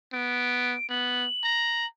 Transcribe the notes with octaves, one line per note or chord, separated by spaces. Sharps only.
B3 D7
B3 F#7
A#5